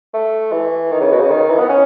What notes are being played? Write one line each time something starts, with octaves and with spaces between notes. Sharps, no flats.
A3
E3
D#3
C#3
B2
C#3
D#3
E3
B3
C#4